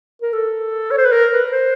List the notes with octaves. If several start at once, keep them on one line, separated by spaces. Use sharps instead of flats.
A#4
A4
C#5
C5
B4
A#4
B4
C5